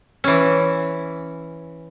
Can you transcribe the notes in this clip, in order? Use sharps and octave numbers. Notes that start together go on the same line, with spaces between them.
E3 C#4